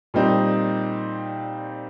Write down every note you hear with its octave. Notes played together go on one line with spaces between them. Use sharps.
A#2 G3 C4 D#4